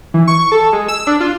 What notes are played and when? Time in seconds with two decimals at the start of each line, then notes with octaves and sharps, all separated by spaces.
0.14 E3
0.28 C#6
0.52 A4
0.73 G#3
0.88 E6
1.07 D4
1.20 F4